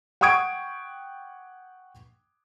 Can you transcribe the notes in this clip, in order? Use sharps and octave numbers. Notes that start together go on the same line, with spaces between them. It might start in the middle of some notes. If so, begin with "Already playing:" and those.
F#5 G5 C#6 D#6 G#6 D7